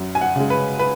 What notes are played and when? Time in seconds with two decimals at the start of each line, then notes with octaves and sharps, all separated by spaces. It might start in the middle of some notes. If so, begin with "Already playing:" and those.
Already playing: F#2
0.15 G#5
0.21 F#5
0.36 C#3 G#3
0.50 B4
0.79 B4